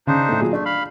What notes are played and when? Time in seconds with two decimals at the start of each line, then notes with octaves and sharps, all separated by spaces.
0.07 C#3 D4 D#4 C5
0.29 A2 A3
0.41 A#2 F#3 G#4
0.53 A3 D4
0.65 F5 B5